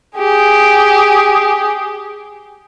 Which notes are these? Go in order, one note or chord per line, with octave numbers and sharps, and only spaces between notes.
G4 G#4